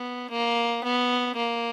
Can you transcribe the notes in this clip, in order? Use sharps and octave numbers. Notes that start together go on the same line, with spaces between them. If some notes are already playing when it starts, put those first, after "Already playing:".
Already playing: B3
A#3
B3
A#3